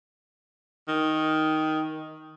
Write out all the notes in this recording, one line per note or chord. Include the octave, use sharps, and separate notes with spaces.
D#3